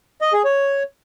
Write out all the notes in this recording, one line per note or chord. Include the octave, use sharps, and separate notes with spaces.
D#5
G#4
C#5